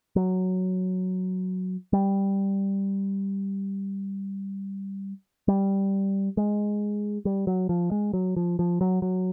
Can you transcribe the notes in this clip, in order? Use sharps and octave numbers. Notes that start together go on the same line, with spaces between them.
F#3
G3
G3
G#3
G3
F#3
F3
G#3
F#3
F3
F3
F#3
F#3